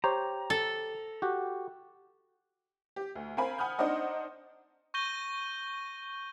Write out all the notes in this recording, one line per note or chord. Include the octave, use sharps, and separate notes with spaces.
G4 C5 C#5 A#5
A4
F#4 G4
G4
D2
C4 A#4 F5 G#5 B5
F#5 G#5 B5 D#6 F6 G6
C4 D4 D#4 C5 D#5 F#5
C#6 G6 A#6 D#7 G7